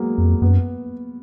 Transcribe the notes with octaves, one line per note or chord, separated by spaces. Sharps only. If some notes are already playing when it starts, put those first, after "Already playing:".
Already playing: F#3 G#3 A#3 B3
F2
F#2 B3